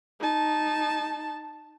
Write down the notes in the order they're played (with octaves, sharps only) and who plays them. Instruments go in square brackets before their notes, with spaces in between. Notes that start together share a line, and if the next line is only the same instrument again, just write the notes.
[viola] D#4 A5